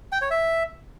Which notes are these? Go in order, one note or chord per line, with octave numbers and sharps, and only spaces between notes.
G5
C#5
E5